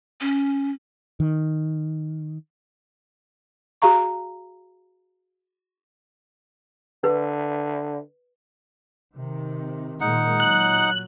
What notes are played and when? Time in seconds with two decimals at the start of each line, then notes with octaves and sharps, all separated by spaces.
0.21 C#4
1.20 D#3
3.82 F#4 G#4 F5 A#5 C#6
7.04 D3 B4
9.15 C3 D#3
10.01 A#2 D#3 G#3 D#4 F#5
10.40 A#2 F#3 F#6